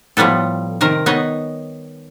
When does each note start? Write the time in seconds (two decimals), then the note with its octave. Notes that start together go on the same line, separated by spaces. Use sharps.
0.17 A2 F3 G3 B3 A4
0.81 C3 D#3 A#4
1.06 B3 D#4 C#5 D#5